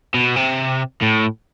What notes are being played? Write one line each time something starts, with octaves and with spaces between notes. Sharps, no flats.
B2
C3
A2